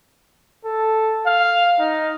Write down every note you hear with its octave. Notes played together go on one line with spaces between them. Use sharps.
A4
F5
D#4